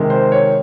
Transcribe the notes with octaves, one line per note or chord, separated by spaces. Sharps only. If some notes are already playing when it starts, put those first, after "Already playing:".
Already playing: C3 D#3 G#3
C5
C#5